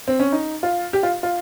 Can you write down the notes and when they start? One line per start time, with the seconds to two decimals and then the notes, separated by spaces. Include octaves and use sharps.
0.08 C4
0.20 C#4
0.32 D#4
0.63 F4
0.93 G4
1.03 F4
1.23 F4